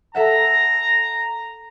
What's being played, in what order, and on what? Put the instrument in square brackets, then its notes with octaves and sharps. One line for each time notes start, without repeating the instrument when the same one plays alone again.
[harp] A4 E5 F#5 [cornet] A#5